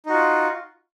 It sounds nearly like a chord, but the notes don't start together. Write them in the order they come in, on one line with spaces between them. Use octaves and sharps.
D#4 F#4 F4